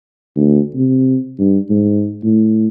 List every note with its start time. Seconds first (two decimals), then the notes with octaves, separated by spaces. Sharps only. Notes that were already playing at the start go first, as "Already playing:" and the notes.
0.36 D2
0.75 C3
1.39 G2
1.70 G#2
2.23 A2